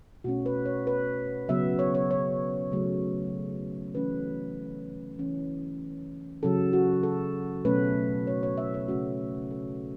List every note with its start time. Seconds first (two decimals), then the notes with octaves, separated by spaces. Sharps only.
0.24 B2 A3 C#4 F#4
0.46 B4
0.66 C#5
0.87 B4
1.49 C#3 F#3 B3 E5
1.79 C#5
1.95 C#5
2.11 C#5
2.72 C#3 F#3 A3
3.95 E3 A3 C#4 B4
5.19 E3 C#4
6.43 C#3 F#3 C#4 A4
6.73 F#4
7.03 A4
7.65 B2 F#3 A3 C#4 B4
8.27 C#5
8.43 C#5
8.58 E5
8.74 C#5
8.88 C#3 A3 C#4 F#4
9.51 A4